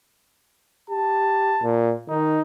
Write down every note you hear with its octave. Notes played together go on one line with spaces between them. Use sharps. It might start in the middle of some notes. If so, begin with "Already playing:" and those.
G4 A5
A#2
D#3 D#4